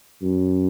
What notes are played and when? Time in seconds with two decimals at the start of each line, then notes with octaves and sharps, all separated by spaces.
0.22 F#2